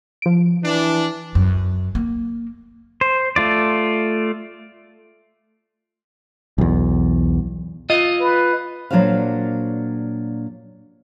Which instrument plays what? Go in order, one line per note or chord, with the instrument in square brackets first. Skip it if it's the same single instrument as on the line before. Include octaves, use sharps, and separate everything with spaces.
[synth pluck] F3 D7
[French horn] E3 [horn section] D4
[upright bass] F#2
A#3
[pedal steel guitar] C5
A3 F4 D5
[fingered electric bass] B1 E2
[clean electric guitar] F4 D#5
[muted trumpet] B4
[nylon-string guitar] A#2 F#3 D4 F#4 C5 F5